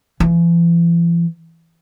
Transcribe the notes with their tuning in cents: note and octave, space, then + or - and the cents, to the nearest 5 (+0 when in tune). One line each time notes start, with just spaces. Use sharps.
E3 +45